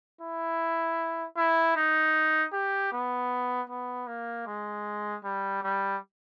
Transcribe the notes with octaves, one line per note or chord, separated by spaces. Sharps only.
E4
E4
D#4
G4
B3
B3
A#3
G#3
G3
G3